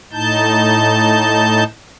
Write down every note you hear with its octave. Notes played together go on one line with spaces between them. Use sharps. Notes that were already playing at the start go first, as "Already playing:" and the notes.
A2 D#4 A5 G6